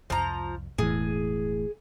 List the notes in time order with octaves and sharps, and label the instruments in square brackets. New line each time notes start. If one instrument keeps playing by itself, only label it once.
[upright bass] C2 F2 [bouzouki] F3 A#5
[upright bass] E1 G#3 [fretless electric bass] A2 E3 [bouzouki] G#4